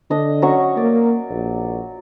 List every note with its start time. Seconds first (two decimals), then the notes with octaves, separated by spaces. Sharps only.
0.11 D3 D4 D#5
0.42 F#3 C#4 C#6
0.77 A#3 D5
1.31 A#1